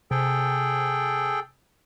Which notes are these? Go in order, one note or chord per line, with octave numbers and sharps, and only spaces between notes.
C3 G#4 A4 G5